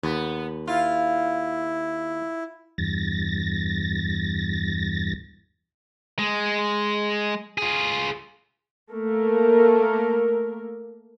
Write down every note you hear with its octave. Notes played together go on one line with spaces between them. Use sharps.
D#2 B3
E4 F4
E2 G2 A6 A#6
G#3
F4 G#4
A3 A#3 A#4